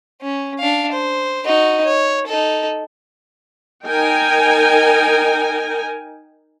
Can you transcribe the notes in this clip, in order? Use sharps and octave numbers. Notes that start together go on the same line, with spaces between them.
C#4
D4 F5
C5
D#4 F#4
C#5
D#4 A4
D#4 A#4 G5 G#5